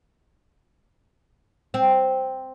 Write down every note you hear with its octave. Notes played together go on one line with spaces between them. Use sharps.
C4